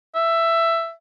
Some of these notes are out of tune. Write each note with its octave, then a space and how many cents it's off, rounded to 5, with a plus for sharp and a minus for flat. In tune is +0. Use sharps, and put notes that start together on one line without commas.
E5 +10